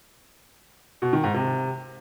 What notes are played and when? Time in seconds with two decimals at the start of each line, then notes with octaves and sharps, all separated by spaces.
1.02 B2
1.13 D#3
1.23 G#2
1.34 C3